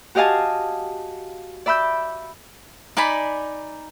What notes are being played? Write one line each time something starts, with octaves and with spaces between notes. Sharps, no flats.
F#4 G4 D#5 F5 G#5 A5
D5 E5 B5 E6 G6
D#4 D5 G#5 B5